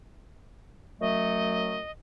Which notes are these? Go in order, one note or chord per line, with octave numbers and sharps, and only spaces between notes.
F#2 F#3 A3 D#5